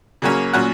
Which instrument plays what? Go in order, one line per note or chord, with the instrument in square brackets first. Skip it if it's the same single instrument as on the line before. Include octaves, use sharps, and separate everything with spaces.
[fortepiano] C#3 F#3 A#3 C#4
A#2 F#3 C#4 F#5